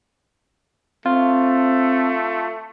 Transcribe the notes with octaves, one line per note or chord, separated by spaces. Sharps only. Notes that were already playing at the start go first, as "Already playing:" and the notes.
A3 C4 F4